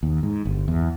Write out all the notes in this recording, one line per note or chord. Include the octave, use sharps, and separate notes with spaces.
D#2
G#2
G1
E2